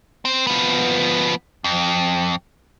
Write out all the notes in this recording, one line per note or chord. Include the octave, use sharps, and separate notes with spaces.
C4
F3 B3
F2